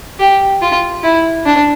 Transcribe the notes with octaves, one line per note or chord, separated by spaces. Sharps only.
G4
F4
E4
D4